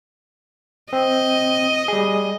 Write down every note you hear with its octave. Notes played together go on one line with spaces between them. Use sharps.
C4 D#5
G3 G#4